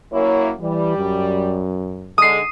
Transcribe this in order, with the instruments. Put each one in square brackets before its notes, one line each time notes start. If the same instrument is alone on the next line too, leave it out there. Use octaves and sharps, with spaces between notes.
[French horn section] F#2 A#3 E4 [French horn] C#5
[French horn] E3 [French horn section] G3
[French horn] F#2
[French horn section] D3 G#3 [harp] D#6 C7